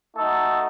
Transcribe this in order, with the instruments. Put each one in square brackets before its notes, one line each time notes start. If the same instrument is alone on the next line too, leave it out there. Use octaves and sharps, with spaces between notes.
[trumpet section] A3 D#4 F#4 A4